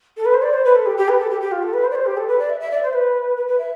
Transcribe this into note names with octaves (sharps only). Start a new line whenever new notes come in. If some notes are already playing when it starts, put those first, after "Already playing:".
A4
B4
C5
D5
C5
B4
A4
G4
G4
B4
A4
G4
G4
F4
A4
B4
C5
D5
C5
G4
A4
B4
D5
E5
E5
D5
C5
B4
B4
B4
E5